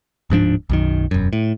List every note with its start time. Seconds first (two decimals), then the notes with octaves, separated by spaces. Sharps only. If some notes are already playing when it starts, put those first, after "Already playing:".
0.30 D1 G#2 F3 D4
0.69 B1 F#2 D#3
1.11 E1 F#2
1.33 A2